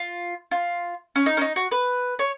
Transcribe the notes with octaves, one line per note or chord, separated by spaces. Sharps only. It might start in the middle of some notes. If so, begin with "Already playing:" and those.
Already playing: F4
F4
C#4
D#4
C#4
D#4
F#4
B4
C#5